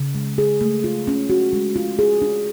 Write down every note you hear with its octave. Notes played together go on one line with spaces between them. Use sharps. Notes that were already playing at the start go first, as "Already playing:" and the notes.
Already playing: C#3
G#3
G#4
A3
F4
C#4
F#4
G#3
F4
G#4
D4